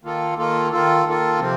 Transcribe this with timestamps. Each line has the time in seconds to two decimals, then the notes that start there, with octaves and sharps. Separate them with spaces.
0.04 D#3 A#3 F4 A4
0.37 D#3 A#3 F4 A4
0.71 D#3 A#3 F4 A4
1.06 D#3 A#3 F4 A4
1.40 C3 F3 C4